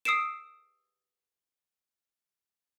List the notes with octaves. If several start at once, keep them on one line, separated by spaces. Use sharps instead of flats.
D#6 E6 C7 D7 E7